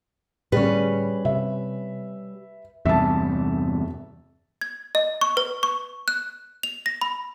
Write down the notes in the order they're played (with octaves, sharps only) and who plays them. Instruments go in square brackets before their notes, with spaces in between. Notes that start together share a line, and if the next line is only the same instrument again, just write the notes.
[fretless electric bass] A2 D3 [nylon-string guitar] G3 C#4 [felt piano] G#4 D5 [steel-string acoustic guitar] B4
[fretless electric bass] C3 [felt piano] E5
[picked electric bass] E2 G2 C3 [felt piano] E5 A5
[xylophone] G#6
D#5
C#6
B4
C#6
F#6
F7
A#6
B5